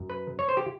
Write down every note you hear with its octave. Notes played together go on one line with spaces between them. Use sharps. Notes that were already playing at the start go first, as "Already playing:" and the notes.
Already playing: F#2
B4
C#5
C5
G4